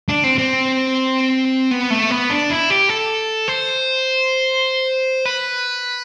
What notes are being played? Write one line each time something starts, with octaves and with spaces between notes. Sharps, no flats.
D4
C4
C4
B3
A3
B3
D4
E4
G4
A4
C5
B4